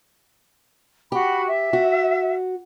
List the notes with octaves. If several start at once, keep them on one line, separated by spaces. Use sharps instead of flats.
F#4 G4 B5
E5
F#4